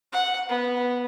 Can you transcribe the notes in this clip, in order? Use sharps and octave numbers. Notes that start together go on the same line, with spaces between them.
F#5
B3